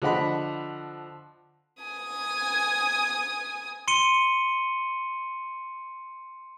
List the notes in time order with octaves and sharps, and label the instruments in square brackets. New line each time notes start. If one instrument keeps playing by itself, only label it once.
[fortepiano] D3 F3 D#5 F#5 B5
[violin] G#5 D#6
[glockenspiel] C6 C#7 D#7 G7